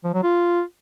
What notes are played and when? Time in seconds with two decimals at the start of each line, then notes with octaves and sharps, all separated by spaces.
0.04 F3
0.14 F#3
0.23 F4